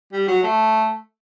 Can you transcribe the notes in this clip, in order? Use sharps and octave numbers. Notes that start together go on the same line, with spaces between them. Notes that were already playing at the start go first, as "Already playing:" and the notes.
G3
F#3
A3